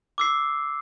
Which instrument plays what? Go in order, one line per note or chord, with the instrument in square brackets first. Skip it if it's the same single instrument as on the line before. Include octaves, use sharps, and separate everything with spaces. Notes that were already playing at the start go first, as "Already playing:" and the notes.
[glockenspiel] D6 E6 C7